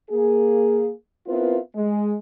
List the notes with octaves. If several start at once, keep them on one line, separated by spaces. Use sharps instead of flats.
A#3 G#4
B3 C4 E4 F4 A#4 B4
G#3